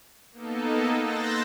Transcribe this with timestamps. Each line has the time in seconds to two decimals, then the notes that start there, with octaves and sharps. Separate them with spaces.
0.32 A#3 B3 D#4 A4
1.02 C6 E6 F#6 G6 A6 A#6